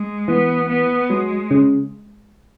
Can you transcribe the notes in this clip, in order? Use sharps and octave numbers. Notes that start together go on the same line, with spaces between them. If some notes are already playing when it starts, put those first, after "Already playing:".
Already playing: G#3
E3 B3
B3
F#3 G#3
C#3